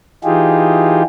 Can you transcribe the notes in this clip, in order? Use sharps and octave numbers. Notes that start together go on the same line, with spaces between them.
E3 D#4 F4 G4 G#4